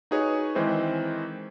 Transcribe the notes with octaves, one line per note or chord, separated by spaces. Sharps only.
D#4 F#4 G#4 B4 C#5
D#3 E3 G#3 C4 C5